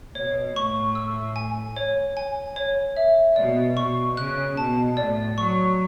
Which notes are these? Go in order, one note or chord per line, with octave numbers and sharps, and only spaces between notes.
B2 C#5
A2 C#6
E6
G#5
C#5
G#5
C#5
E5
B2 D5
B2 C#6
C#3 F#6
B2 A5
A2 D5
F#3 C#6